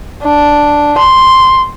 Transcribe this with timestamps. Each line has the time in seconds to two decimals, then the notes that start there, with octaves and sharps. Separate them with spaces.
0.23 D4
0.98 C6